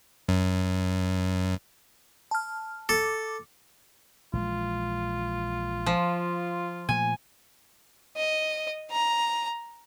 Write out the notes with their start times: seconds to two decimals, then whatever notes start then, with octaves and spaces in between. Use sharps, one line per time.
0.29 F#2
2.31 A5 F6
2.89 A4 D6
4.33 A#1 E3 G#3 F4
5.86 F3
6.89 A#2 F3 A3 G#5
8.16 D#5
8.91 A#5